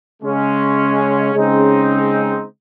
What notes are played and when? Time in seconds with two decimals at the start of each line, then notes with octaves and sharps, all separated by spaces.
0.22 C#3 G#3 C#4
1.33 C#3 G#3 C4 D#4